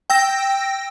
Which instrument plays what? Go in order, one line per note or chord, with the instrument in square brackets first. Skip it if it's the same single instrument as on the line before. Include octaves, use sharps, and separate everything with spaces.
[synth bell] G5 E6 A#6